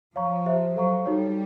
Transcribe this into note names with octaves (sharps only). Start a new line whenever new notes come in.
F3 C#5 F5 A#5 C#6
G4 C5 E5
F#3 A4 C5 F5 A#5 C#6
G3 D#4 F#4 A4 C#5